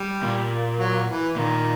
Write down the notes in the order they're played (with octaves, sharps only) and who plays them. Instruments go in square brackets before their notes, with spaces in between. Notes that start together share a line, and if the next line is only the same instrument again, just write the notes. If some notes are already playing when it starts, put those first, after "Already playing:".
Already playing: [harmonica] G3
[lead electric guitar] A#2
[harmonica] F#3
E3
[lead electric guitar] A#2 [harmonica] D#3